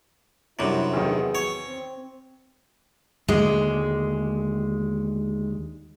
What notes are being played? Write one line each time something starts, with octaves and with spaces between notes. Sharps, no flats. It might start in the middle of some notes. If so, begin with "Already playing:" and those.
F#2 C3 G3 D4 E4
E2 D#3 F#3 B3 G#4
C#5
C4
D#2 D3 G#3